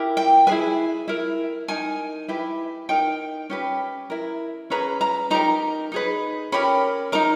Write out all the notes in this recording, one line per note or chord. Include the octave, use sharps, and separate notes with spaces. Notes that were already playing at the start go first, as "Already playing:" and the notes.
Already playing: E4 G4 A#4
G5
E4 G#4 B4 G#5
E4 A#4
D#4 A#4 G#5
E4 G4 B4
D#4 A#4 G5
C#4 G4 B4
E4 A#4
C#4 G#4 B4 A#5
A#5
D#4 G4 A#4 A#5
D#4 G#4 B4
C#4 G4 A#4 B5
D#4 A#4 A#5